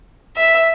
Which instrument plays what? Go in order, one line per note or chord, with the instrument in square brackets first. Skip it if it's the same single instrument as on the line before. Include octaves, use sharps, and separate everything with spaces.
[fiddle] E5